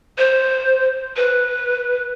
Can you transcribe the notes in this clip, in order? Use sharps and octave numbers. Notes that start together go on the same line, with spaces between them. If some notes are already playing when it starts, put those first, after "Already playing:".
C5
B4